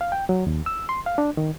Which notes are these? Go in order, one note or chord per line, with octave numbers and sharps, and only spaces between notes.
F5
G5
F#3
D#2
E6
C6
F5
D4
D#3